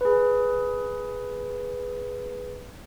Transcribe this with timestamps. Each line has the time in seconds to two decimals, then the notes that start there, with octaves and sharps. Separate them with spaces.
0.01 G#4 B4